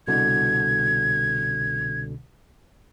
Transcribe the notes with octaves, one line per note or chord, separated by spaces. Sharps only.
C2 B2 D3 G#6